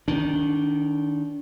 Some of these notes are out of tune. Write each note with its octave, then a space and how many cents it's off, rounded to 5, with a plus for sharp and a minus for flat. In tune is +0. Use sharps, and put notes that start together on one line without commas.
D#3 +0 D4 -30